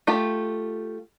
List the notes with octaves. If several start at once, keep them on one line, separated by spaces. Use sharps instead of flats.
A3 F4 G4